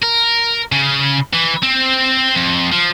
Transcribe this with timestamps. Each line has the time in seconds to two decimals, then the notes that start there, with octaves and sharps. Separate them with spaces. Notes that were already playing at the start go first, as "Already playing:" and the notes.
0.02 A#4
0.72 C#3
1.33 E3
1.62 C4
2.36 F2
2.72 F3